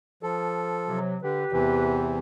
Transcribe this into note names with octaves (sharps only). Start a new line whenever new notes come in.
F3 A4
C3 F#3
D3 G4 B4
E2 C3 E3